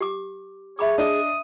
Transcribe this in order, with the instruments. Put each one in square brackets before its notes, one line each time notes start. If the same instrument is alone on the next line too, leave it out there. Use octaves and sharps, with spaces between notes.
[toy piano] G4 D6
[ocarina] G#4 [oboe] C#5 [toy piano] E5 B5 D6
[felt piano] D4 D#5 [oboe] D#6